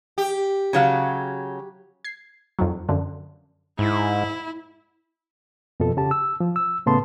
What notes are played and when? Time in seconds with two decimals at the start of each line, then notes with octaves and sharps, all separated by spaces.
0.18 G4
0.73 C#3 F#3 F5
2.04 G#6 C7
2.59 F2 D#3 F#3
2.89 F#2 D3 F3
3.79 G#2 E4
5.80 F2 B2 F3 A4
5.97 C#3 G4 A5
6.11 E6
6.40 F3
6.56 E6
6.86 A2 C#3 A3 B3 A5 C6